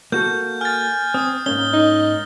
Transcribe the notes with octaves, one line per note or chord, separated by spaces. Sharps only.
A#3 F#4 A4 G6
G#5 F6 A6
C4 D#6
G#2 A#3 C#4 G7
D#4